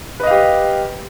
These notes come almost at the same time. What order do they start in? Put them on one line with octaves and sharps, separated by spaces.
B4 D#5 F5 G4